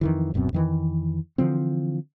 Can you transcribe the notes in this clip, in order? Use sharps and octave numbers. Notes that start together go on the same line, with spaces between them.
F2 D#3 E3
D1 F#2 B2 C4
F2 D#3 E3
D3 E3 F3 C4